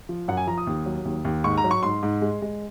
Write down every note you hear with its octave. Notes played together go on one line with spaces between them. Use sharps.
F3
F#2 F#5
G#5
F3 A#5
D#6
D#2
F#3
D#2
D#2
G#2 C#6
A#5
F#3
C#6
G#2 C6
G#2
G#3
G#3